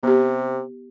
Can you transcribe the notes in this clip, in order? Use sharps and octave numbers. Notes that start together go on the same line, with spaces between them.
C3 B3 G4